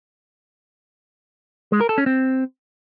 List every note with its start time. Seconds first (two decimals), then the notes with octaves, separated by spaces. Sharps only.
1.72 G#3
1.81 A#4
1.89 A4
1.98 C#4
2.06 C4